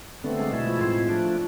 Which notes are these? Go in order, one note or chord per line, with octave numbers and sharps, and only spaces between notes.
D3 A3 B3 C4
G#3
B2 G#3 A3 E4
F3
A2 F3 G#3 C4 E4
F3 A3 D4